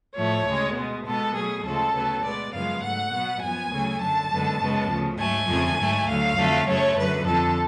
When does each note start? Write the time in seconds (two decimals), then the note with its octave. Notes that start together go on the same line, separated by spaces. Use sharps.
0.16 A2 F3 A3 C#5
0.46 D2 C#3 G#3
0.75 B2 G#3 B3
1.05 B2 G#3 B3 A4
1.35 B2 F#3 A3 G#4
1.64 D2 C#3 F3 G#3 A4
1.93 D2 C#3 F#3 B3
2.23 B2 G#3 B3 D5
2.53 F#2 C#3 F3 G#3 B3 F5
2.83 G#2 F#3 A3 F#5
3.12 B2 F#3 B3
3.42 F#2 F3 B3 G#5
3.71 D2 C#3 F#3 A3
4.01 F#2 D3 F#3 A5
4.31 F#2 D3 G#3 B3
4.60 F#2 C#3 G#3 B3
4.90 D2 C#3 F3
5.19 G#2 F#3 A3 G#5
5.48 F2 D3 F3 A3
5.78 G#2 F#3 A3
6.08 D2 D3 F#3 F5
6.38 F2 D3 F#3 A3
6.67 F#2 C#3 F#3 A3 C#5
6.96 F#2 D3 F#3 B4
7.26 F2 D3 F3 A4